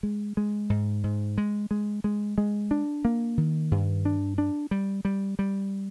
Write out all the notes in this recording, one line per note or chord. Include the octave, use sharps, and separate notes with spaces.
G#3
G#3
G#2
G#2
G#3
G#3
G#3
G#3
D4
A#3
D#3
G2
D4
D4
G3
G3
G3